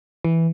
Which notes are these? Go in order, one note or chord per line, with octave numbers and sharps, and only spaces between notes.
E3